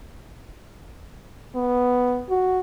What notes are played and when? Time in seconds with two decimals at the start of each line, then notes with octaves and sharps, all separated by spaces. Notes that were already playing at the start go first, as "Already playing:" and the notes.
1.56 B3
2.30 F#4